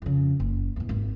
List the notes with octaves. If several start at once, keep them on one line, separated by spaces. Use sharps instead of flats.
F2 C#3
F#1
E2 A2
G#1